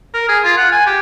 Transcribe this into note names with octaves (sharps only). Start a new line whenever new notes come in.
A#4
G#4
F4
F#5
G#5
G4